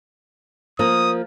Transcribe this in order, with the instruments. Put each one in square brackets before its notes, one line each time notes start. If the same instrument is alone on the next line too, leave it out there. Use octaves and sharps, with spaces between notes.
[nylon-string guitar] F3 A#3 A#4 [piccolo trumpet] D#6